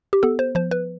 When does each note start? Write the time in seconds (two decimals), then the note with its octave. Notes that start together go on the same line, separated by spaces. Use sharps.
0.13 G4
0.23 B3 A4
0.39 C5
0.55 F3 C5
0.71 B4